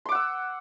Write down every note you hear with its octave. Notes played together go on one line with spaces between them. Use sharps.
F#5 C6 D6 E6